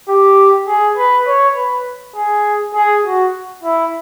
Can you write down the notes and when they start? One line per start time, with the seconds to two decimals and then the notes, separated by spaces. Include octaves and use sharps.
0.08 G4
0.67 G#4
0.97 B4
1.27 C#5
1.56 B4
2.16 G#4
2.75 G#4
3.05 F#4
3.64 E4